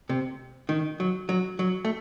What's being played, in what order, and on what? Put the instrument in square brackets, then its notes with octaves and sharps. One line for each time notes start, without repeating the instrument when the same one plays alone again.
[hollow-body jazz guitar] C3
D#3
F#3
F#3
F#3
A3